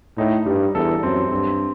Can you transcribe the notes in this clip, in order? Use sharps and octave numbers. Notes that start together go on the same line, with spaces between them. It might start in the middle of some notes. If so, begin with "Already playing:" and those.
A2 D#4
G2 G3
E2 A4
F#2 C4
G2 C4